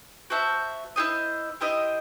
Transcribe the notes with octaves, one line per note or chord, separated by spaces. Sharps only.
F#4 C5 E5 A5
E4 G4 C5 D#5
E4 G4 C5 D#5